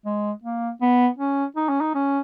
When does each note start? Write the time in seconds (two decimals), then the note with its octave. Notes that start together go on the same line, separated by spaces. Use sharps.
0.05 G#3
0.44 A#3
0.81 B3
1.18 C#4
1.56 D#4
1.69 C#4
1.81 D#4
1.95 C#4